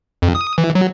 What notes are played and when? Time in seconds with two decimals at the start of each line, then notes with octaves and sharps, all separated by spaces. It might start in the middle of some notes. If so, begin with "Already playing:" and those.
0.22 F2
0.35 D#6
0.58 E3
0.75 F#3